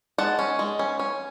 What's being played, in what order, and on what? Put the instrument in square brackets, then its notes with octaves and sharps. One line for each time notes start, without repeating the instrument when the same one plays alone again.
[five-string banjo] G#3 F#5 A5
C#4
G#3
C#4
C#4